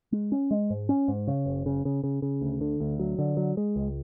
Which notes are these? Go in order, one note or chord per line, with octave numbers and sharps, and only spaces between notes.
G#3
C#4
G#3
G#2
C#4
G#2
C#3
F#1
C#3
C#3
C#3
C#3
D2
D3
D2
F#3
D3
F#3
G#3
C#2